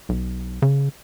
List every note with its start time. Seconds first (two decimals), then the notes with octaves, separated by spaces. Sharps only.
0.09 B1
0.62 C#3